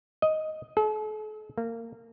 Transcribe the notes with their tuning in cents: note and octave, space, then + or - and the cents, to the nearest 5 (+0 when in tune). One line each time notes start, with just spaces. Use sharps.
D#5 +5
A4 -45
A#3 -25